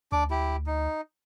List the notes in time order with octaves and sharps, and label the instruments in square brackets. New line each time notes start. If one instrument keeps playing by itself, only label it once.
[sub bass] D2 [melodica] D4 D6
[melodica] E4 G4
D#4